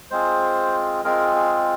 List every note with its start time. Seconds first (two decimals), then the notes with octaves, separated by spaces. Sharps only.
0.11 G#3 C4 F4 G#4 C5
1.04 G#3 C4 F4 G#4 A#4
1.36 G#4